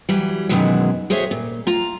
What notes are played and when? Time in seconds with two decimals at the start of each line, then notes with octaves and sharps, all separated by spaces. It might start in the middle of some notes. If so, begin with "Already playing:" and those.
0.09 E3 F#3 G3
0.49 F#2 B2 D#3 E3 F#3 G#3
1.10 F#4 G#4 C5 C#5 E5
1.31 A#2
1.67 F4 A#5